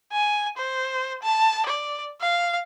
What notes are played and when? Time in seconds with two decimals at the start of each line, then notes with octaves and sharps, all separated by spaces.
0.12 G#5
0.57 C5
1.23 A5
1.66 D5
2.21 F5